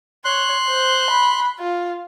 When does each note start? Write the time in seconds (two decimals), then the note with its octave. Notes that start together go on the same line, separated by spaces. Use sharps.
0.25 C#5 C6 F#6
0.68 C5
1.10 B5
1.59 F4